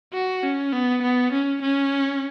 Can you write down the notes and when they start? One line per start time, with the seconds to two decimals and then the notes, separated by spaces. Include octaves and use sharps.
0.13 F#4
0.43 C#4
0.73 B3
1.02 B3
1.32 C#4
1.62 C#4